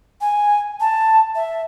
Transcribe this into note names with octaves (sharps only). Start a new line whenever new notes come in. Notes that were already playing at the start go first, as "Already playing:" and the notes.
G#5
A5
E5